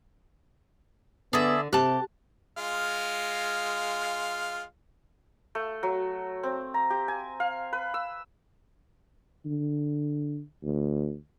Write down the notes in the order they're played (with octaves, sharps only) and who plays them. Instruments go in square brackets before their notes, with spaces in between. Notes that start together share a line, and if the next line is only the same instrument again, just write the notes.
[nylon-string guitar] D3 [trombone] B3 [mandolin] D4 G#4 E5
[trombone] C3 [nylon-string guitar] G4 [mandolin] A5 F#6
[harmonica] G#3 F4 F5
[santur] A3
F#3
C4
A#5
G4
G#5
F5
B4
E6
[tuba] D3
D2